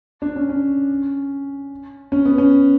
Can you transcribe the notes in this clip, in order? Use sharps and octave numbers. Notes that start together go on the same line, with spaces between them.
D4
C#4
C#4
C#4
B3
C#4